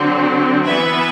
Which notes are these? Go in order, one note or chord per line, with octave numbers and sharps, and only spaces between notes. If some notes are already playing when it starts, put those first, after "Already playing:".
Already playing: D3 F#3 C4
E3 B3 E4 B4 E5